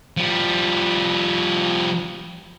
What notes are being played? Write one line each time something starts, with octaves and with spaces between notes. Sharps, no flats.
F3 G3